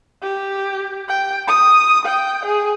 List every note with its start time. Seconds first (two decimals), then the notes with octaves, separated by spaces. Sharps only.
0.23 G4
1.09 G5
1.47 D#6
2.05 G5
2.45 G#4